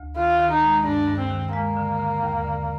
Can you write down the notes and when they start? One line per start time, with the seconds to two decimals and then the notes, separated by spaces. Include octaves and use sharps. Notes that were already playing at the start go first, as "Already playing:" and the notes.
Already playing: D2
0.16 D#3 F4
0.39 D#3
0.51 D#4
0.62 G#3
0.85 G2 D4
1.08 G2
1.19 C4
1.30 D#3
1.53 G#3 A#3
1.77 D3
1.99 D3
2.22 D#2
2.44 D3